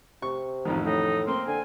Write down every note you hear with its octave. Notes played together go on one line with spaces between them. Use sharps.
C3 C#6
A1 F2 D#3
A2 D#4
A#3 C4 C6
D3 G#5